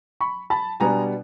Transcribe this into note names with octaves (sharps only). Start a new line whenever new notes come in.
B5 C#6
A5 B5
B2 G3 B3 D4 G#5 A#5